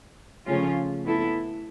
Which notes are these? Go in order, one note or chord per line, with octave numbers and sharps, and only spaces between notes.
C#3 F3 A3 C#4 F4
B3 E4 A4